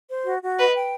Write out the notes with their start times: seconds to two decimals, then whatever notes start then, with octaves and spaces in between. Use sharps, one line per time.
0.10 C5
0.26 F#4
0.42 F#4
0.58 B4 D#5
0.75 G5